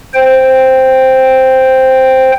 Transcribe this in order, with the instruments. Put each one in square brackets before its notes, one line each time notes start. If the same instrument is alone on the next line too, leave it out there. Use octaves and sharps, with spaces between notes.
[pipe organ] C5 G5